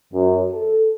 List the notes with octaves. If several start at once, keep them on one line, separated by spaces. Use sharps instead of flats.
F#2
A4